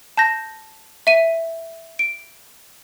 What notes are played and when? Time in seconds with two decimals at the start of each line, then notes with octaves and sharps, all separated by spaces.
0.17 A5 G6 A#6
1.07 E5 D#7
1.99 D7